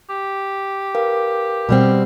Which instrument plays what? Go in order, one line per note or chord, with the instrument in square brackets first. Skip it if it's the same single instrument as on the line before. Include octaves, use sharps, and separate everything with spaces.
[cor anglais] G4
[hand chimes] A#4 B4 F5
[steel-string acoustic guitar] B2 G3 C4